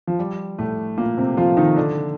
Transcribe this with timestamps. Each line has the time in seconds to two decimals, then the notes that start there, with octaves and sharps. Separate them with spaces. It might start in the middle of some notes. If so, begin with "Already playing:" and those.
0.07 F3
0.19 G3
0.59 A2 A3
0.97 A#2 A#3
1.17 C3 C4
1.37 F3 F4
1.57 D#3 D#4
1.77 D3 D4